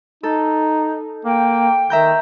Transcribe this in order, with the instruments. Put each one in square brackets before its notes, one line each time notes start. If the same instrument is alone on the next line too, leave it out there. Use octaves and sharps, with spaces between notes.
[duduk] D#4 [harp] A4
[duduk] A#3 [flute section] G5
[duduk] D#3 [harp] E5 A#5 G6